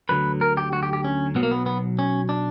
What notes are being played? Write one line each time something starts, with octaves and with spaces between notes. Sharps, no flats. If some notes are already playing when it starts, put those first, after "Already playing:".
D2 D3 F#3 B4
A#4
G4
F#4
G4
G4
C#4
B1 B2 F#3 B3
A#3
B3
B3
C#4
D4